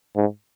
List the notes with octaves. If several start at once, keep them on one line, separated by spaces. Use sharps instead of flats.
G#2